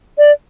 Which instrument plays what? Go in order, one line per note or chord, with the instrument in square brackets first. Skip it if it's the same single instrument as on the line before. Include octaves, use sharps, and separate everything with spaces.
[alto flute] D5